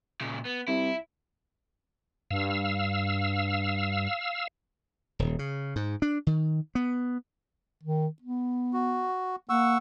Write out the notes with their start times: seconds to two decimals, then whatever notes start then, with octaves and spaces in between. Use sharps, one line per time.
0.21 A#2 C#3
0.45 B3
0.68 C2 E4
2.31 G2 F5 E6
5.19 D#1
5.39 C#3
5.76 G#2
6.02 D4
6.27 D#3
6.75 B3
7.83 D#3
8.22 B3
8.73 F#4
9.49 A#3 F#5 C#6 E6